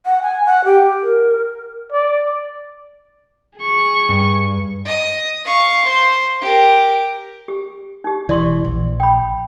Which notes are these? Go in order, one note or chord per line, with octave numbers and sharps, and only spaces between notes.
F#5
G#5
F#5
G4
A#4
D5
G#4 C#6
G2
D#5 D#6
F5 C#6
C5 C6
G4 A#4
G4
D#4 G4
E1 E3 D5 C6 C#6
A#1
G5 B5